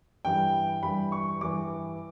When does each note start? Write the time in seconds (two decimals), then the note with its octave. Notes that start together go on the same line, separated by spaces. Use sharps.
0.25 G2 E3 G3 G5
0.83 G2 E3 G3 B5
1.12 C#6
1.41 G2 E3 G3 D6